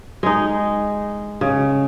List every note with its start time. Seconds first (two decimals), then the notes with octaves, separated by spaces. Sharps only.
0.23 G#3 D#4
1.41 C#3